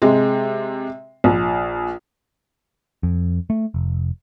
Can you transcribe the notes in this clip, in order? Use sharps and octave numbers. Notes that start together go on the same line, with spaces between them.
C3 G#3
A#1
F2
A3
F1